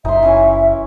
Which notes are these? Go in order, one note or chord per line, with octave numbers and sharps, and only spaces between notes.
F#1 D#4 E5 C6
E3 C#4 E4